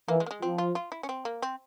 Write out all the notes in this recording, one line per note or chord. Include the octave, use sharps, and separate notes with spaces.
E3 A#3
G#3
A#3
G#3
F3 C4
F4
F4
E4
C#4
C4
A#3
C4